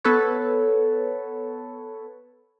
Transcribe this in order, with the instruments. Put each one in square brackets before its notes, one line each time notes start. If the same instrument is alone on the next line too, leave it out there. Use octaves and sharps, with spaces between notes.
[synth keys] B3 A4 B4 C#5